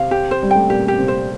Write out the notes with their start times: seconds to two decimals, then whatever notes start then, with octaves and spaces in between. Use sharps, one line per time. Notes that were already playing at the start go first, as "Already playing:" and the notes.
Already playing: C3 C4 F5
0.11 G4
0.31 C5
0.43 G3
0.51 A3 G5
0.69 A#2 A#3 G4
0.88 G4
0.98 C3 C4
1.08 C5